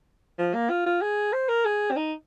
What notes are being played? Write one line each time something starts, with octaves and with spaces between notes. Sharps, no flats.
F3
A#3
F4
F4
G#4
C5
A#4
G#4
C4
D#4